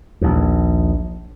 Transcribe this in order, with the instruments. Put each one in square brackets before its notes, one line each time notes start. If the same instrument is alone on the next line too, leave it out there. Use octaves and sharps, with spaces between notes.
[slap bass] A#1 D#2